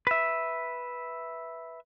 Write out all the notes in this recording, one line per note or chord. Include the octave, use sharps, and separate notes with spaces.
B4 E5